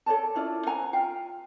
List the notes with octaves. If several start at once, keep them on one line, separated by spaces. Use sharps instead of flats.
A4 C#5 D5 A5
C#4 E4 F4 D5
C5 F#5 G#5 A#5
F4 F5 G5